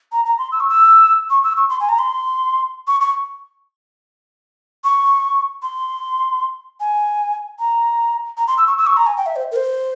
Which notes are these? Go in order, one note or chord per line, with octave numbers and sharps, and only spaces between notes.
A#5
A#5
C6
E6
C#6
E6
C#6
E6
C#6
C6
G#5
A#5
C6
C#6
C#6
C#6
C6
G#5
A#5
A#5
C6
E6
C#6
E6
C#6
A#5
G#5
G5
E5
C5
A#4
C5